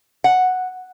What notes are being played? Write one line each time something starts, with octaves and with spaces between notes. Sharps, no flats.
F#5